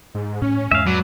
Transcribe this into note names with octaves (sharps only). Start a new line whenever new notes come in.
G#2
A2 C#4
E2 G#2 G#3 E5 F5
F#3 B4 D5